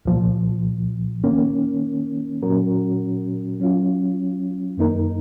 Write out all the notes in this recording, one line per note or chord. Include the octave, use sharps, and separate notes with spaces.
C2 A#2 F3
D#3 A#3 C#4
A#2 F#3 C#4 F#4 A#4
F#3 C#4 F4
F#2 D#3 A#3 D#4 A#4